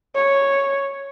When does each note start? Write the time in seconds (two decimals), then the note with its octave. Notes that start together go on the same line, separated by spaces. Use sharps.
0.15 C#5